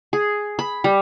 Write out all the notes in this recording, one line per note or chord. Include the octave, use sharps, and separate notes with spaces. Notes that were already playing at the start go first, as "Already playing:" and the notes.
G#4
B5
G3